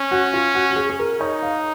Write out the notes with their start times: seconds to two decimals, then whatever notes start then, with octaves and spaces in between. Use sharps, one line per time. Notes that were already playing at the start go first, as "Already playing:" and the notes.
Already playing: C#4
0.11 F#4
0.33 F4
0.55 F#4
0.71 F#4
0.76 G#4
0.89 G#4
0.99 A#4
1.20 D#4 C#5
1.42 F5